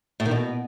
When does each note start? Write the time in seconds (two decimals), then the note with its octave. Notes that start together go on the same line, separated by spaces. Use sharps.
0.20 A2
0.25 D#3
0.31 B2